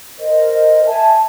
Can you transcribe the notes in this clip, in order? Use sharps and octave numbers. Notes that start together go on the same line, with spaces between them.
A#4 C5 D#5
E5 G#5 A5